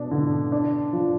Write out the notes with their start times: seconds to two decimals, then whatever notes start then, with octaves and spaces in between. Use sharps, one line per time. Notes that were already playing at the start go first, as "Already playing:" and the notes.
Already playing: B2 D4
0.11 D3
0.52 D4
0.93 F3